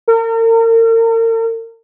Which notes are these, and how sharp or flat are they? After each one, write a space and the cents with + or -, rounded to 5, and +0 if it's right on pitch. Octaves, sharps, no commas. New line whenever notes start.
A#4 -40